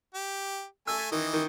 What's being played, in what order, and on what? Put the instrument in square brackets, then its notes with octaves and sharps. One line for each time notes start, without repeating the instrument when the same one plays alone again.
[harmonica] G4
[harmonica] A3 G#5 [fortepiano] E6
[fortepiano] D#3 [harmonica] E3 D#5
[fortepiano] D#3